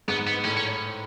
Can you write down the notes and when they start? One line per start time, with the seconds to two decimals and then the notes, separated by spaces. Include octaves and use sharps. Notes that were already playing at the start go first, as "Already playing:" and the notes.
0.08 G#2 G#3 B3
0.27 B3
0.45 A2 A3 C#4
0.57 C#4